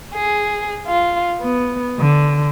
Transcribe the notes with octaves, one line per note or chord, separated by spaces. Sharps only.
G#4
F4
B3
D3